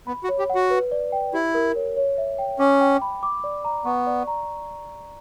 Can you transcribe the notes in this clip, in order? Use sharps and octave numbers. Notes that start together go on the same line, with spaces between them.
B3 B5
F#4
C#5
G4
F#5
F#4
B4
D5
G5
E4 G4
A#4
C#5
C#5
E5
G5
C#4 D6
G5
B5
D6
D5
A#5
B3 C#6
D5
A#5